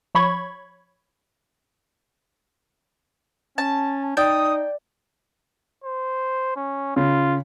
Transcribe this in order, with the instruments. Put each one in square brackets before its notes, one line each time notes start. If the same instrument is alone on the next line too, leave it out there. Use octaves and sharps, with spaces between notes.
[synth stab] F3 C#5 B5 C#6 G#6
[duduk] C#4 [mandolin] A5
[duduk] D#4 [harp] D5 [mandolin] G5 [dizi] D#6
[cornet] C5
C#4
[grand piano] C#3 [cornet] F4